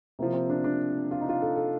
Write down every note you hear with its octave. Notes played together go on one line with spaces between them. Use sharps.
C3 F3 A#3
C4
D4
D4
F4
D#4
F4
A4
A4